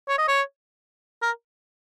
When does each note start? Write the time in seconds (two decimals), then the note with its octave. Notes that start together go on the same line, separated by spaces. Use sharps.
0.09 C#5
0.19 D#5
0.28 C#5
1.22 A#4